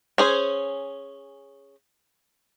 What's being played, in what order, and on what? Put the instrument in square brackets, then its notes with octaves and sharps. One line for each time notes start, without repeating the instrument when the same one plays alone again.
[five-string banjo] C#4 G#4 C5